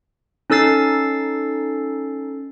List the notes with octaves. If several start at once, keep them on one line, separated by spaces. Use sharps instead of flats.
C#4 D#4 A4 E6 A6 C7